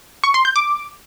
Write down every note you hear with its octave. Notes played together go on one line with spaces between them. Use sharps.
C#6
C6
G6
D6